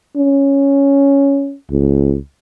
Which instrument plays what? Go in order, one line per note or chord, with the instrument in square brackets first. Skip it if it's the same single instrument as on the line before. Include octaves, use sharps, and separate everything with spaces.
[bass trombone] C#4
C#2